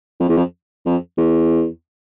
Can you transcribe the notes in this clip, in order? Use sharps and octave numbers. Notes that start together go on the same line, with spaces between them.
F2
E2
F2
F2
E2